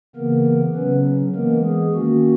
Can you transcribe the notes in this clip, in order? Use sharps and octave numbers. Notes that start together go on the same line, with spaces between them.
C#3 E3 A#3 B3 A#4
C#3 F#3 B3 C#4 B4
E3 G#3 A#3 B3 A#4
G#3 G#4
D#3 A#3 C#4 F#4